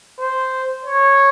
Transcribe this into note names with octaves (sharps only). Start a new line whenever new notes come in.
C5
C#5